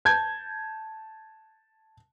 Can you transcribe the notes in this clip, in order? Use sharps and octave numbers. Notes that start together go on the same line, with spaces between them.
A5 G6 G#6